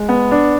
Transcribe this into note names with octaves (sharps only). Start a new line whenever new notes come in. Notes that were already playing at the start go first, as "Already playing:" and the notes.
Already playing: G#3
B3
D4